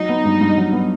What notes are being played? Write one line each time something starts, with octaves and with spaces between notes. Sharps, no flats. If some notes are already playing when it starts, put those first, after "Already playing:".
Already playing: F#3 D#4
B3
G2
G2
F#3
B3